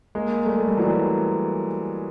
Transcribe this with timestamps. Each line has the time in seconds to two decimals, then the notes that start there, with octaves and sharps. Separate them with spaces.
0.15 G#3 A#3
0.46 G3 A3
0.67 G3
0.77 E3 F#3